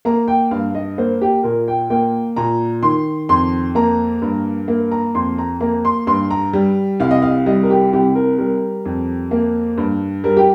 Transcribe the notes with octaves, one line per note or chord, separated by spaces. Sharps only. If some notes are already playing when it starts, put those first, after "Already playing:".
A#3 A#5
G5
G2 F5
D#5
A#3 C5
G4
A#2 A#4
G5
A#3 G5
A#2 A#5
D#3 C6
F2 C6
A#3 A#5
G2
A#3
A#5
F2 C6
A#5
A#3 A#5
C6
G2 C6
A#5
G3
C2 F5
D#5
F5
G3 D#5
A#4
G4
C2 G4
A#4
G3 A#4
F2
A#3
G2
G3 A#4
G4